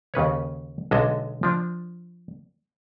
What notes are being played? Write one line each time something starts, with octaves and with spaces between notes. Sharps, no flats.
D#2 C#3 B4 C#5
B1 D3 G#3 F#4 D#5 E5
F3 D4